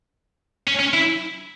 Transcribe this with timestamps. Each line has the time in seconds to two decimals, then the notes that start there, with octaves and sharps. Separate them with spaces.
0.68 C#4
0.80 C#4
0.94 E4